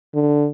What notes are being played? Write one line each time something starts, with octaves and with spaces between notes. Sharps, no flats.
D3